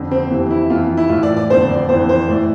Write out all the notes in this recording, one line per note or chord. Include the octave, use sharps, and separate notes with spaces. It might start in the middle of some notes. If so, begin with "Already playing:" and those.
Already playing: F2 D3
C4
F2 C3 E3
E4
F2 E3 F4
E4
A2 E3 F4
D5
D5
F2 D3 C5
D5
F2 E3 C5
C5
A2 E3 D5